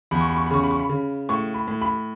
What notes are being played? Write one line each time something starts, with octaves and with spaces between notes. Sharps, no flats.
E2 B5
C#6
B5
C#6
B5
C#3 C#6
B5
C#6
B5
C#3
A2 C#6
B5
A2
B5